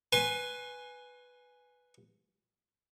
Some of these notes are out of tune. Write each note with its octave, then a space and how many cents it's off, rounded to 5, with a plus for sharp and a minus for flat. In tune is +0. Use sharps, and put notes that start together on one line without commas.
B4 +0 G#5 +0 C6 +40